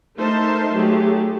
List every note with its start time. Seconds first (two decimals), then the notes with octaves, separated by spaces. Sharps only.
0.17 A3 D#4 A#4 C5 E5 A5
0.74 F#3 A3 G4 G#4